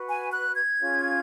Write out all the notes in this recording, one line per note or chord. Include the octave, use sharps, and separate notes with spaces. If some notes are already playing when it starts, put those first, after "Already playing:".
Already playing: F#4 B4
G#5
F#6
G#6
C#4 F4 G#4 C#5